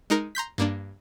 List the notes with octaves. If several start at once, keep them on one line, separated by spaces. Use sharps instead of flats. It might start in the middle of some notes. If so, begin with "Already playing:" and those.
G#3 D#4 A#4
A#5 C6 G6 B6
G2 A#3 D4